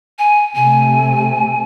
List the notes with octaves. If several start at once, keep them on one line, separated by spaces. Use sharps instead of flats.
G#5
C3 A3 G#5